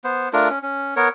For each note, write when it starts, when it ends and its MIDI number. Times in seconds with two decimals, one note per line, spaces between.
0.04 0.29 59
0.04 0.29 72
0.33 0.49 57
0.33 0.49 62
0.33 0.49 65
0.33 0.49 70
0.50 0.59 61
0.63 0.94 61
0.96 1.09 59
0.96 1.09 70
0.96 1.09 73